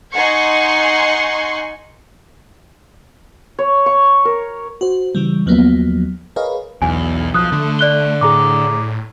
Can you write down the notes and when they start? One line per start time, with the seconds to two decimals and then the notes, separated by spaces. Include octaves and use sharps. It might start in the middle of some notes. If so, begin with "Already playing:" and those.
0.14 D#4 F#5 G#5 C6 C#6
3.59 C#5
3.86 C#6
4.25 A#4
4.81 F#4 C5
5.15 C#3 E3 G3
5.46 D#2 F3 F#3 A#3 B3
6.36 G#4 A#4 B4 C#5 D#5 F5
6.82 B1 E2 G#5
7.34 F3 D#6 F#6
7.52 D3 A3
7.79 D5 F#6 G7
8.21 A2 G#4 A#5 D6